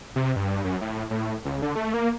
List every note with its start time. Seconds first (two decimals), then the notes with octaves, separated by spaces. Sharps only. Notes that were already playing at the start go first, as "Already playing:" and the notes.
0.16 C3
0.36 G2
0.64 F#2
0.81 A2
1.10 A2
1.45 C#2
1.62 D3
1.76 A3
1.94 A#3